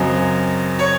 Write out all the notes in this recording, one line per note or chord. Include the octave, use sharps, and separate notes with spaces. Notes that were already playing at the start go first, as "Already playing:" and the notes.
Already playing: F#2 C#3 F#3 C4 D#5
C#5